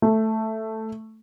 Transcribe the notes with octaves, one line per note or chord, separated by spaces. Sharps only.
A3